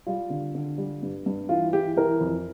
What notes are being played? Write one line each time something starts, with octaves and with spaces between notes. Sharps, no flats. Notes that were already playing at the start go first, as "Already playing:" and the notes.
G3 F4
D3
D3
G3
G2
G2
E3 F4
E3 G4
E3 A#4
F2